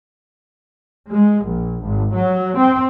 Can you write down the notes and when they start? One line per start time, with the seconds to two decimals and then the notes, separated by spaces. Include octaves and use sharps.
1.09 G#3
1.46 A#1
1.84 G#1
2.13 F#3
2.58 C4